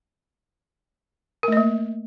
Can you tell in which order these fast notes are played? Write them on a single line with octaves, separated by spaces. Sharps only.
A#4 A3 D#5 A#3